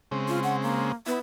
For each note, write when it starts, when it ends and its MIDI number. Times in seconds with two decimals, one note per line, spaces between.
0.11 0.92 49
0.11 0.92 56
0.11 0.92 60
0.28 0.39 65
0.43 0.56 78
0.62 0.93 58
1.06 1.18 59
1.06 1.19 64